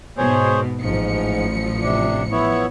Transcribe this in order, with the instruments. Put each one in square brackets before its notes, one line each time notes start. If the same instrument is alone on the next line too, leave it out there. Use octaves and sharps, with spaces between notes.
[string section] G#2 B2 [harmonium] G#4 C5 C#5
[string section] A1 F3 C#7 [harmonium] G#2
[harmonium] C3 D4
B3 E4 C#5